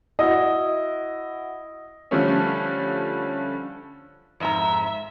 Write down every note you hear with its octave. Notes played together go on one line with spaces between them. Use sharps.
E4 F#4 D#5
D3 F3 G3 A3 C#4
F2 G#2 E5 A#5